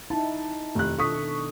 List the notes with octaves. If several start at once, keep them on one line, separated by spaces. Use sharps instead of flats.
D#4 E4 A5
F1 D#3 F#6
B2 D4 A4 C#6 D#6 B6